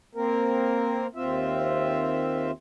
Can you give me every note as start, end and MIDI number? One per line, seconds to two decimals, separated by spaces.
0.15 1.07 58
0.15 1.07 60
0.15 1.07 70
1.15 2.51 39
1.15 2.51 60
1.15 2.51 65
1.15 2.51 76